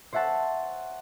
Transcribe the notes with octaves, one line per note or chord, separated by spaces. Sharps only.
C5 C#5 E5 F#5 A5